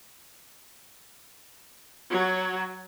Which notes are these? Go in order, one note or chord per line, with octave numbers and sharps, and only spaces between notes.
F#3 C#5